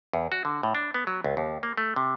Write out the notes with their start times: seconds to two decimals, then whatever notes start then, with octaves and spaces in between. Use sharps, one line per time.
0.13 E2
0.32 F#4
0.45 D3
0.63 A2
0.75 D4
0.94 B3
1.07 F#3
1.24 C#2
1.37 D#2
1.63 A#3
1.77 A3
1.96 C3